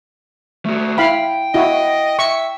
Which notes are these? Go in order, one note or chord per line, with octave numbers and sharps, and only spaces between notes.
A3 F#4
E4 F5 G5 B5
E4 F#4 D#5
E5 C#6